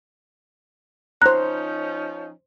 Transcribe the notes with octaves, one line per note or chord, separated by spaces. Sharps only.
F3 C#4 D#4 C5 A#5 F#6